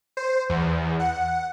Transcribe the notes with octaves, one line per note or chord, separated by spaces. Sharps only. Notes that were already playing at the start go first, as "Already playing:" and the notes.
C5
E2
F#5